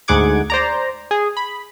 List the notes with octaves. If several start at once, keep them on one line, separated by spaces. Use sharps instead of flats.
D2 G#2 G#4 F#5 D6 G#6
C5 D5 A#5
G#4
B5